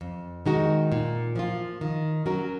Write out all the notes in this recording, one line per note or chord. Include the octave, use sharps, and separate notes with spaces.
F2
D#3 G#3 D#4 F#4
A#2
F3 A#3 F4
D#3
F#3 C#4 F#4 A#4